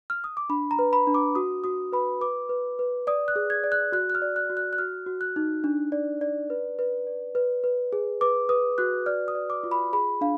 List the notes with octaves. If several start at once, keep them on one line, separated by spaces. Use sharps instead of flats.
F6
D#6
D6
D4 B5
A#5
B4
B5
D4
D6
F#4 D#6
F#4 D#6
B4 B5
B4 D6
B4
B4
D5 D#6
F#6
G#4
G#6
D5
F#6
F#4 F#6
F#6
F6
D5
F#6
F#4
F#6
F#6
F#4 F6
F#4
F#6
D#4
D4
D5
D5
B4
B4
D5
B4
B4
G#4
B4 D6
B4 D#6
F#4 F#6
D5 F6
D#6
D5
D6
F4
B5
G#4 B5
D4 F5